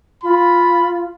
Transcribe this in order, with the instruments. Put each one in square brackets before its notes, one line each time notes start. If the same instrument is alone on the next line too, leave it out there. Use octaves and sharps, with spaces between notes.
[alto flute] F4 [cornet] B5